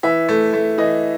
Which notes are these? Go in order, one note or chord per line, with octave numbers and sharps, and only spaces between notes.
E3 E5
A3
A3
E3 D#5